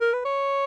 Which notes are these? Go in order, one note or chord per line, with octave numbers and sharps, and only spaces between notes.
A#4
B4
C#5